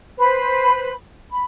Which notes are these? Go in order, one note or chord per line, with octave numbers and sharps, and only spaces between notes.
B4 C5 B5
B5